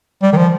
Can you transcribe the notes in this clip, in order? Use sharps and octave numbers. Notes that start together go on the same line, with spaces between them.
G3
D#3
F3